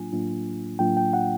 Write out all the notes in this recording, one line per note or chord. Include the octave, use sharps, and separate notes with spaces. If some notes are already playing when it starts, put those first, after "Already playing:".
Already playing: A2 F#3 A#3 D4 F4 G#5
A2 F#3 A#3 D4 F4
A2 F#3 A#3 D4 F4 G5
G5
F#5